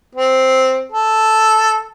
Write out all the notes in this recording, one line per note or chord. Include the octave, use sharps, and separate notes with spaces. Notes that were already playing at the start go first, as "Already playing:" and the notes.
C4
A4